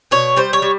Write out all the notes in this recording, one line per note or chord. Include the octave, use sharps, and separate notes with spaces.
B2 C#5
G3 C5
C#5
G3